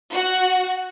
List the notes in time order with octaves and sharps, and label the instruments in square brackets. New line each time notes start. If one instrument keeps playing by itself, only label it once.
[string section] F#4 F#5